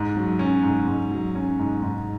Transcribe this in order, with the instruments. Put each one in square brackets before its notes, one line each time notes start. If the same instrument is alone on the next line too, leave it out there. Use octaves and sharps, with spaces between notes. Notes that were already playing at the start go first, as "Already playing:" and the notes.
Already playing: [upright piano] G#2
F#3
C#4
G#2
G#2
F#3
C#4
G#2
G#2